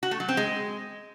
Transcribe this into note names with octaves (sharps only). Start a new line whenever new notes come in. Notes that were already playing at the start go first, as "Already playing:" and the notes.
F#4
A3
F#3
C4
G#3